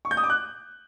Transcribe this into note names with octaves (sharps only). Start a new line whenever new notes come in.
C#6
G6
D#6
D6
F#6